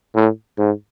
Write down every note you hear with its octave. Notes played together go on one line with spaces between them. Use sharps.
A2
G#2